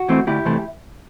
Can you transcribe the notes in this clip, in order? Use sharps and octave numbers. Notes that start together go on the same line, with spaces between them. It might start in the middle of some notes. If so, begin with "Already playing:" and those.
Already playing: F#4
E3 A3 C4
D2 E4 G4
C3 E3 A3